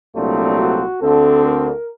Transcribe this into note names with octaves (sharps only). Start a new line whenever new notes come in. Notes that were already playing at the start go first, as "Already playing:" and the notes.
C2 A#2 F#3 A3 C4 D4
F#4
D2 D3 A3 C4 A4
A#4